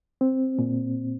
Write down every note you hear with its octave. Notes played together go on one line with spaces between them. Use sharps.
C4
A#2